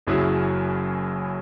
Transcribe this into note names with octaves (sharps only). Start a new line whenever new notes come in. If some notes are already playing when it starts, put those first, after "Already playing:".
F#1 F#2 F#3 E4 G#4